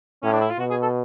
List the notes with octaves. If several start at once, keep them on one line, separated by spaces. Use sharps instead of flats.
A2 C#4
D4
E4
F4
B2 F#4
G#4
A4